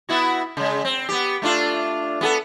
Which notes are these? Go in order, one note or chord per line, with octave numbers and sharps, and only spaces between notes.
B3 E4 F#4
C#3 G#3
C4
B3 G4
A3 D4 F4
B3 G4 A4